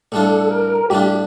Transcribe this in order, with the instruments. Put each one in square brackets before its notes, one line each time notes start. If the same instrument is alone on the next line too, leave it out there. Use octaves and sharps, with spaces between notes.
[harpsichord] A2 G3 D4 F4 [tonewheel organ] A4
[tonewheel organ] A#4
[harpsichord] A2 G3 D4 F4 [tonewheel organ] G4